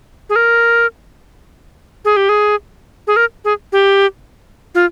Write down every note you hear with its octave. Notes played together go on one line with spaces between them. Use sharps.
G#4
A#4
G#4
G4
G#4
G#4
A#4
G#4
G4
F4